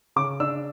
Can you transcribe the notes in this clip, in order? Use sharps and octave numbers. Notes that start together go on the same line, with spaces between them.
C#3 D6
D4 E6